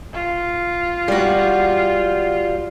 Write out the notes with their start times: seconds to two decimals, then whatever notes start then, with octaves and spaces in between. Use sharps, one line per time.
0.14 F4
1.08 G3 F#4